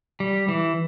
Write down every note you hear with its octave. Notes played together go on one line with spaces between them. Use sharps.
G3
E3